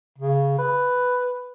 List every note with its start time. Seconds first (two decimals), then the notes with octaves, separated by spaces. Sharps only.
0.18 C#3
0.59 B4